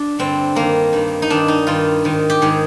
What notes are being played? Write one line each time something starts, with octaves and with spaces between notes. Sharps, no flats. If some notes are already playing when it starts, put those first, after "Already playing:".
Already playing: D4
G2 D3 C4
G2 D#3 A#3
G2 D#3
D#4
G2 D#3 D4
D#4
G2 D#3 F4
G#2 D#3
G4
G#2 D#3 G#4